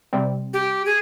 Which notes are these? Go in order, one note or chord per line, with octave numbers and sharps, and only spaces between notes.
C3 G3 C4
G4
G#4